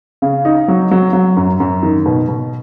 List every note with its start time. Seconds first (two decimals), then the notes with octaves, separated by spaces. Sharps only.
0.22 C#3
0.45 D#4
0.68 F#3
0.91 F#3
1.13 F#3
1.37 F#2
1.60 F#2
1.83 D#3
2.06 B2
2.28 B2